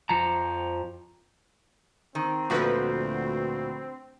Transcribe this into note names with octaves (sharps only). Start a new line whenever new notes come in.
F2 F3 A#5
D#3 C4
D2 A#2 F3 A3 F#4 B4